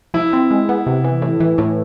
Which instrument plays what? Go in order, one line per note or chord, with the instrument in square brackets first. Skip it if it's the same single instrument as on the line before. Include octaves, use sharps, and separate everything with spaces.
[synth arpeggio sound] F3 [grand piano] E4
[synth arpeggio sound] C4
G#3
B3
C3
E3
A2
E3
A2